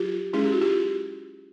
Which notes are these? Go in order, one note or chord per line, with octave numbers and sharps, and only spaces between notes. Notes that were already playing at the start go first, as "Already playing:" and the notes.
Already playing: F#3 F4 G4
G#3 C#4 E4 G#4
G4
F#4
F4 G4